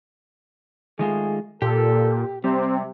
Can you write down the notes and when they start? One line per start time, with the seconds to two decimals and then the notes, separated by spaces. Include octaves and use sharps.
0.99 D#3 G#3 A3 F4 G#4
1.62 A#2 G4 A4
2.44 C3 G3 C4